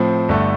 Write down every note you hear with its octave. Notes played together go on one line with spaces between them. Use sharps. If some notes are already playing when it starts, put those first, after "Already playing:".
Already playing: A2 F3 C4
G1 G2 D3 A3